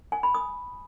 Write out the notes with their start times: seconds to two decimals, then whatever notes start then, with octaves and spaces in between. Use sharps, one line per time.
0.12 G#5
0.23 B5
0.34 D#6